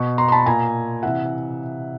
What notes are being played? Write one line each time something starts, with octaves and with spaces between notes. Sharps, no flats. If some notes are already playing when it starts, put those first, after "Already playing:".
Already playing: B2 C#6
A#5 C6
C6
A5 B5
A#2 G#5 A#5
C3 E3 E5 F#5